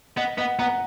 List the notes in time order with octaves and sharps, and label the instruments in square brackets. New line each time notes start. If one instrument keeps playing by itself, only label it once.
[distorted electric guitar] B3 [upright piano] D#5
[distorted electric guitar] B3 [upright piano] D#5 F#5
[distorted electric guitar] B3 [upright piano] F#5 A#5